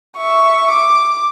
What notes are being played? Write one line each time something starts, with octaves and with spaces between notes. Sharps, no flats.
E5 C#6
D6